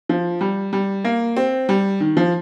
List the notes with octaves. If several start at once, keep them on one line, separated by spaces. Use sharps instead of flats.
F3
G3
G3
A#3
C4
G3
D#3
F3